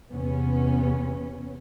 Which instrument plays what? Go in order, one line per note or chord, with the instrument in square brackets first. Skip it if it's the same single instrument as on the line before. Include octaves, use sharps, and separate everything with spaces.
[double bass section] E2 C3 B3 C#4